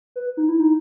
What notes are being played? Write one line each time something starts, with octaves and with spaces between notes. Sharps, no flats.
B4
D#4
E4
D#4